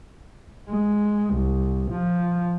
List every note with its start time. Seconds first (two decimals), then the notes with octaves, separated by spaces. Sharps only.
0.70 G#3
1.34 C2
1.91 F3